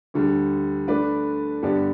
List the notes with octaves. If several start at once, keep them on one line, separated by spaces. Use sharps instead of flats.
D2 D3 G3
D3 A3 D4 B4 D5
G2 D3 B3 G4 D5